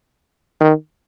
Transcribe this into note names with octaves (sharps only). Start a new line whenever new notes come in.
D#3